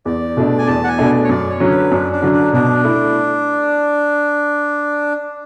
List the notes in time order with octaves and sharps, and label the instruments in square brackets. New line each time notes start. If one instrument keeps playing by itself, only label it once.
[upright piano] E2 [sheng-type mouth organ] D5
[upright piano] B2 A3 D4
[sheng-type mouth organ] G#5
[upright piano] E2 [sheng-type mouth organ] A5
[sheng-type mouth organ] F#5
G#5
[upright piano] B2 A3 D4
[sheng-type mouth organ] C#5
[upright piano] F#2 [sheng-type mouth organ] D5
[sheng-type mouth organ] C#5
[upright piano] D3 F#3 C#4
[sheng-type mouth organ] B4
[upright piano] F#2 [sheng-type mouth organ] D4
[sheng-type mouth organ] D4
[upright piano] D3 F#3 C#4
[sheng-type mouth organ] D4
[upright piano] B2 [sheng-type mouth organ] D4
[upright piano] A3 E4